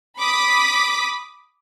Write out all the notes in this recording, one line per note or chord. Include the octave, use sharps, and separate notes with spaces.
B5 D6 D#6 B6